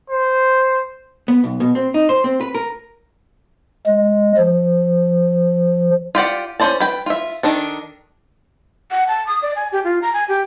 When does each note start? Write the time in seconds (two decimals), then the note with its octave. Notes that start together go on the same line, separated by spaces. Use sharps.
0.10 C5
1.28 B3
1.44 B1
1.60 B2
1.75 C4
1.94 D#4
2.09 C5
2.24 C4
2.41 B4
2.55 A#4
3.86 G#3
4.37 F3
6.15 F4 G4 D5 F#5
6.60 C#4 F#4 C5 D5 A5
6.80 B4 G5
7.06 F4 E5
7.43 D#3 D4 A4
8.91 F#5
9.08 A5
9.27 D#6
9.42 D5
9.56 G#5
9.72 G4
9.84 F4
10.02 A#5
10.14 G#5
10.29 G4